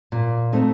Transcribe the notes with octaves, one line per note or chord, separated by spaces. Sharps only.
A#2
A3 C4 D#4